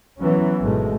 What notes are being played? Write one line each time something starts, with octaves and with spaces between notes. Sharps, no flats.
E3 F#3 B3 C#4
G#1 B2 G#3 A3